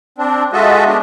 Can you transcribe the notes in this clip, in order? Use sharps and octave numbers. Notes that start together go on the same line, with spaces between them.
C4 D4
G#3 F4 F#4 A4 D#5 E5
G#3 A3 B3 D4